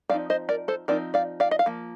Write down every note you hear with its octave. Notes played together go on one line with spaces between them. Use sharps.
F3 C4 D#4 D5 F5
C5 D#5
A#4 D5
A4 C5
F3 C4 D#4 A#4 D5
D5 F5
D5 F5
D#5
F5
F3 A#3